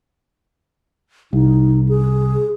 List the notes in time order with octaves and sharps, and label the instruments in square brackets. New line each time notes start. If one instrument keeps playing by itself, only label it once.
[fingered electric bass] C2 [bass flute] D#4
[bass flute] G#4